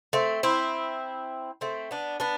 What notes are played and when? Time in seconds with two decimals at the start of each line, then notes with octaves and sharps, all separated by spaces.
0.13 A3 C4
0.43 C4 E4
1.61 A3 C4
1.91 B3 D4
2.20 B3 D4